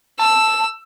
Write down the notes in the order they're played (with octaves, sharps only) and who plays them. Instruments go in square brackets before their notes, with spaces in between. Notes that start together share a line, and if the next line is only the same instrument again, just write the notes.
[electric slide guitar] A5 [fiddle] E6